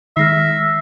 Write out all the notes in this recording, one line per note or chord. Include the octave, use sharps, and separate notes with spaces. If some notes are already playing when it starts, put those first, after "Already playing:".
D#3 G#3 E5 F6 A#6 C7